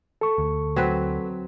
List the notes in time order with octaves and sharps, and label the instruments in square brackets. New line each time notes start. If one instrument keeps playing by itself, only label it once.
[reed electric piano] A4 C#6
[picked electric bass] D2
[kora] F#3 C4 B4